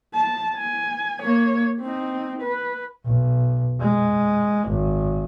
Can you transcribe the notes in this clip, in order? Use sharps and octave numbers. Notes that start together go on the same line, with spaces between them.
A5
G#5
A#3 C#5
C4 D#4
B4
B1
G#3
G#1